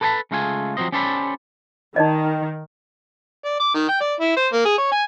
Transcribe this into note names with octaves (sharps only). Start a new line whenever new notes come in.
A4 B4 D5 G#5 A5 B5
C#3 G#3 A3 F4 F#5 G#5
F3 F#3 G#3 C4 C5 D#5
C#4 G4 A4 C5 D5 B5
D#3 D#4 D5 D#5
D5
D6
D#3
G5
D5
E4
C5
A#3
G#4
C#5
G#5